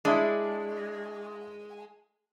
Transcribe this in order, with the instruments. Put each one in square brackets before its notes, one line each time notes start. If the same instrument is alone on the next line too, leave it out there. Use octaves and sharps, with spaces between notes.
[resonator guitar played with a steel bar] G#3 [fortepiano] D4 E4